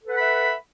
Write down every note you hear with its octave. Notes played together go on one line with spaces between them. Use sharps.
A4 B4 E5 F#5 B5